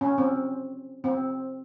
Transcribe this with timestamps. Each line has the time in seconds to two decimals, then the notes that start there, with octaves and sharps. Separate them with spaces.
0.01 C#4
0.18 C4
1.04 C4